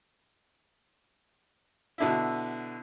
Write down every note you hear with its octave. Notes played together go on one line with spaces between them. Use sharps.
B2 D3 E4